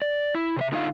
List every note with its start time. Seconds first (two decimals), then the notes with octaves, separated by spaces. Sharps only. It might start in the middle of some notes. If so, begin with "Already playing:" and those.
0.02 D5
0.35 E4
0.57 C3 C5 E5
0.72 D3 D#4 F4 C5 F5